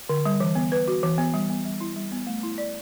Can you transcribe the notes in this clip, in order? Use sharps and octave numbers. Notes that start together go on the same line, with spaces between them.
D3
G3
E3
B3
B4
F#4
E3
B3
G3
B3
G3
E4
G3
B3
A3
E4
D5